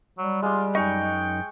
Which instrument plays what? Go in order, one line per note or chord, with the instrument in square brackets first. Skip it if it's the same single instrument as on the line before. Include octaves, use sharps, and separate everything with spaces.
[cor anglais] F#3 [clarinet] G3
[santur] G#3 G4 [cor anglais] F4
[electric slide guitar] F#2 D#4 D#5 [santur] G#3 C#6 [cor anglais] G5